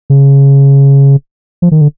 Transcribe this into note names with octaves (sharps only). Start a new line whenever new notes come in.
C#3
F3
D#3
D3